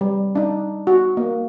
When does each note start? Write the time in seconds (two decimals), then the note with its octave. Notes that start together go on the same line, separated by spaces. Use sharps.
0.01 G3
0.35 D4 D#4
0.87 F#4
1.17 A#3